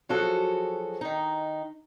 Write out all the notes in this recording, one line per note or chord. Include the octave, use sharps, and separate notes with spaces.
F3 F#3 F#4 G#4 A4
D#3 D#4